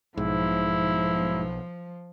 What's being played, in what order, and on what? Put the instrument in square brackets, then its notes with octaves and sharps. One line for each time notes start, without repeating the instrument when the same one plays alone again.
[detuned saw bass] B1 [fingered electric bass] G#2 [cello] F3 [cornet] E4